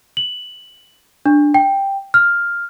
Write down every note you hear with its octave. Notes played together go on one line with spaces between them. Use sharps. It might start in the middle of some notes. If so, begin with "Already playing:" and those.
F#7
D4
G5
F6